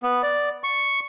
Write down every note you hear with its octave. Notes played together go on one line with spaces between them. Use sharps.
B3
D5
C#6